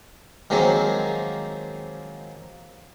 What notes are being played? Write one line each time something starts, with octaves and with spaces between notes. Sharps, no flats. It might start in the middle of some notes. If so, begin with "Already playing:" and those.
D#3 F3 F#3 G#3 A#3 C4